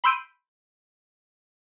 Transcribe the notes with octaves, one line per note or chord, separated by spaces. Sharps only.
B5 C6 E6 G6 D7 D#7